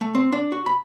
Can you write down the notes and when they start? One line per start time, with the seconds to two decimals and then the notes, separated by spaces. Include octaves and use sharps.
0.01 A3
0.15 C4
0.32 D4
0.52 F#4
0.66 B5